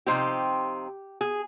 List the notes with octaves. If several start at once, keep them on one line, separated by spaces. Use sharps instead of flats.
C3 F3 C4 D#4 G4
G#4